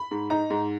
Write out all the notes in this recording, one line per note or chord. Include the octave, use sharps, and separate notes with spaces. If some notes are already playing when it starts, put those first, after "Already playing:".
Already playing: B5
G#2
D#4 A#5
G#2